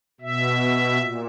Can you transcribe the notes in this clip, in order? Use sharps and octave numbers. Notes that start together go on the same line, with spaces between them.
B2 E5
A#2